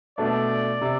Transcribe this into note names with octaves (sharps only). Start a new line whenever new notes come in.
B2 A3 D4 A4 D5
C3